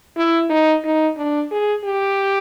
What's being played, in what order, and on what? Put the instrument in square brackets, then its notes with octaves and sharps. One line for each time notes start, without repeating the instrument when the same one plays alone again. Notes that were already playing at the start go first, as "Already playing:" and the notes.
[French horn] E4
D#4
D#4
D4
G#4
G4